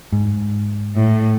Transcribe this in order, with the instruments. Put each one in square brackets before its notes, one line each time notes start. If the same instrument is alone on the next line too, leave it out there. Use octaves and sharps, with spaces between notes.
[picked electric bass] G#2
[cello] A2